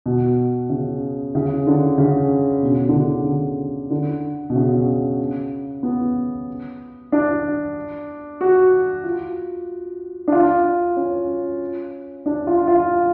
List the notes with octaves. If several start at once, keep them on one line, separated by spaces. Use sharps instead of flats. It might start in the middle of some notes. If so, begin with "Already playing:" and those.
B2
C#3
C#3
D3
C#3
B2
D3
C#3
D3
D3
B2
C#3
B3
D4
F#4
F4
D4
F4
C#4
D4
F4
F4